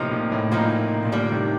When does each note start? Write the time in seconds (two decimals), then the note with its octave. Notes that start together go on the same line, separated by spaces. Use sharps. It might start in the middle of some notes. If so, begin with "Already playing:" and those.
Already playing: A2 C3 F3 A#3 D#4
0.11 A#2
0.32 A2
0.52 A#2 F3 A#3 D#4
1.05 A#2
1.12 A2 D3 G3 A#3
1.32 C3 D#3